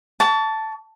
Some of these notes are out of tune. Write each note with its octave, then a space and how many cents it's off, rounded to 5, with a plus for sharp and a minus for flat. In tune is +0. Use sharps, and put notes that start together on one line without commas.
A5 +0 C#6 +40